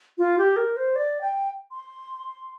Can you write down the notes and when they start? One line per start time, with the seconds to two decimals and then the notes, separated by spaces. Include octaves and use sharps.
0.18 F4
0.38 G4
0.56 A#4
0.77 C5
0.96 D5
1.21 G5
1.71 C6